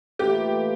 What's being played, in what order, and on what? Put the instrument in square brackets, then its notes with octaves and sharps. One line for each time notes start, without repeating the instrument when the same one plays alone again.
[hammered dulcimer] A2 E3 A#3 F4 [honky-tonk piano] G4